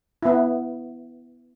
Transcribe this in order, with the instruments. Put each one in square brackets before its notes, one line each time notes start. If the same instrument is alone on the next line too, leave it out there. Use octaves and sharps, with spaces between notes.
[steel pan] B3 E4